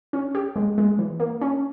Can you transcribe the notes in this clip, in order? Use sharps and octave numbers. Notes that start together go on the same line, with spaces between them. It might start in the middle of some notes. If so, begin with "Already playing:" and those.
C#4
G4
G#3
G#3
E3
A#3
C#4